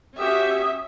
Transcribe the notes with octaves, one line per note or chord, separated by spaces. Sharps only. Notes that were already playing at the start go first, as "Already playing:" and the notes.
C#4 F#4 G4 E5 D#6